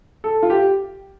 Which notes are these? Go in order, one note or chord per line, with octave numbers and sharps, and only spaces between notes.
A4
F4
G4